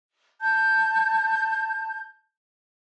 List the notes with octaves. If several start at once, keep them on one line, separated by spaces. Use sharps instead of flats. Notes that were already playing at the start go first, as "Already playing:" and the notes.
A5 G6